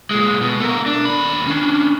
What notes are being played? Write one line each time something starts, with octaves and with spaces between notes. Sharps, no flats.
A#2 G#3
B2
A3 A#4
D4
D#2 B5
C#4 D4